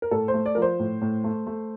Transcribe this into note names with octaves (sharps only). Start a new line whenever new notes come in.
A#4
A2 A4
C5
A3
D5
F3 A#4
C5
A2
A2
A3
A3